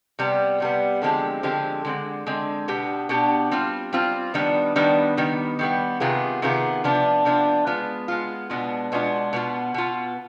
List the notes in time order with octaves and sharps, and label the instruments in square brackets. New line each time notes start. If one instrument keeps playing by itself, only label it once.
[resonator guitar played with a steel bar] C3 G3 B3
C3 G3 B3
D3 F3 G#3 C4 G4
D3 F3 G#3 C4 G4
D3 G#3 C4
D3 G#3 C4
B2 B3 D4 G4
B2 B3 D4 G4
G3 C4 F4
G3 C4 F4
D#3 G3 B3 D4
D#3 G3 B3 D4
D#3 G3 B3
D#3 G3 B3
C3 D#3 B3 F4 G#4
C3 D#3 B3 F4 G#4
C3 F3 B3 D4
C3 F3 B3 D4
G#3 B3 F4
G#3 B3 F4
B2 G#3 B3 D4 F4
B2 G#3 B3 D4 F4
B2 B3 F4
B2 B3 F4